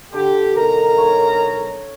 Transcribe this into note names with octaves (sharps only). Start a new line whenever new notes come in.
D3 G4
B1 A#4 A#5
C#5 F5